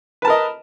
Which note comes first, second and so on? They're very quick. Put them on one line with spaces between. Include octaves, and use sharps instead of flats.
B4 A5 A#4 D#5